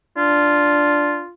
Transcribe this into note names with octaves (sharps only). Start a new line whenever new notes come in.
D4 F4